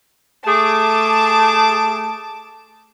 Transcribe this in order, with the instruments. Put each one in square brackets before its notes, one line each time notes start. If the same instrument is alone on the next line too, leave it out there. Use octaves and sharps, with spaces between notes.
[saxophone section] A3 G#4 [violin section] A5 D6